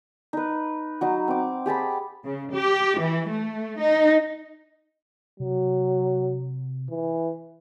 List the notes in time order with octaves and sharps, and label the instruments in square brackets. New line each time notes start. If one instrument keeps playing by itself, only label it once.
[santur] D#4 B4
F#3 D#4
C4 D6
G4 G#4 A5 B5
[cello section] C#3
G4
E3
A3
D#4
[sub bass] C3 [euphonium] F#3
[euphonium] E3